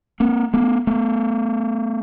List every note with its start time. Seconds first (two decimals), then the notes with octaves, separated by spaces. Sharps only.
0.20 A#3 C4
0.53 A3 B3
0.87 A3 B3